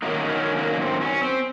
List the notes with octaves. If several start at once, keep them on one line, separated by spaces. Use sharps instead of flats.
F#2 D#3 F#3 A#3 D#4
C#4
A#3
C4
C#4
C4